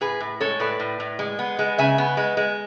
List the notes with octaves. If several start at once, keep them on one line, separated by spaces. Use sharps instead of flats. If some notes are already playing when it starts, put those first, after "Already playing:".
A2 G#4 B4
A2
G#3 A4 C#5
A2 B4 D5
A2
A2
G#3
B3
G#3
C#3 E5 G#5
B3
G#3
G#3